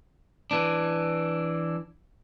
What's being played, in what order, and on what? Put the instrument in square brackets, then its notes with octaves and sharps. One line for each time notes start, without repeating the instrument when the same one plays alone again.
[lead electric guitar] E3 D4